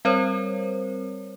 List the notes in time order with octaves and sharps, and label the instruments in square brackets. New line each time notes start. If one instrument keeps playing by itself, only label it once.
[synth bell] G3 C4 A#4 C5 C#5